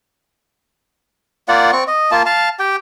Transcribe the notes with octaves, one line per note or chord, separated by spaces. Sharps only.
A#3 F4 D5 F#5
C4 C#6
D#5
A#3 F4 A5
F5 A5
G4 G5